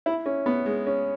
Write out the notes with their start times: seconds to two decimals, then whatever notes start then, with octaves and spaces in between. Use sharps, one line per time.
0.06 E4
0.26 C#4
0.46 B3
0.66 G#3
0.87 C#4